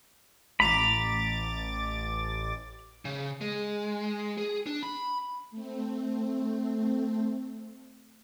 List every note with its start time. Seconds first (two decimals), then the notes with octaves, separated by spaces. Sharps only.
0.60 A1 A#5 B5 D6 A6
3.05 C#3
3.41 G#3
4.38 G#4
4.66 D4
4.83 B5
5.51 A3 C4